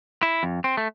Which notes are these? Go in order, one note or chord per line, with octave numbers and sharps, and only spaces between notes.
E4
F2
C4
A3